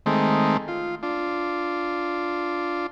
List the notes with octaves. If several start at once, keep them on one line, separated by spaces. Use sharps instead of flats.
D#3 G#3 A3 C4
F4
D4 F4